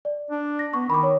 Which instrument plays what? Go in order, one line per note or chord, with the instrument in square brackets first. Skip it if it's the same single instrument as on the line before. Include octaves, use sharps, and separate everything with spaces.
[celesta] D5
[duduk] D4
[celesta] A#6
[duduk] B3 [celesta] C#6
[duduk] D#3 [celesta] B5 D6
[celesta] C#5